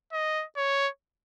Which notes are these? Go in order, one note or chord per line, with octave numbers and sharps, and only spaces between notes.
D#5
C#5